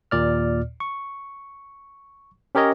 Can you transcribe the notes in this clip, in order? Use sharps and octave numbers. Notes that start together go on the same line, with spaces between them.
D#2 A#2 D5 F6
C#6
C#4 G4 A#4 C#5 D#5